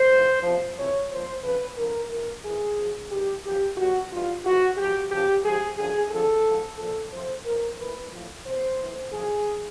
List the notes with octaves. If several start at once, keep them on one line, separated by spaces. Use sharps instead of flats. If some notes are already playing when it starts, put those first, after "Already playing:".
Already playing: C5
G#2 E3
E2 C3 F3
F2 C3 E3 C#5
A#2 F3 C5
F2 C#3 F3 B4
F2 D3 F3 A#4
G#2 E3 A#4
A2 E3 G#4
F#2 C#3 F3
G2 D#3 G4
F#2 C#3 F3 G4
A#2 F3 F#4
G2 E3 F4
G#2 E3 F#4
G#2 F3 G4
F#2 C#3 F3 G4
G#2 F3 G#4
F#2 D3 F3 G#4
F2 D3 F3 A4
G#2 F3
A#2 F3 A4
F2 C3 F3 C5
G#2 E3 A#4
A2 E3 B4
A2 F3
E2 B2 C5
A2 E3
F#2 D3 F3 G#4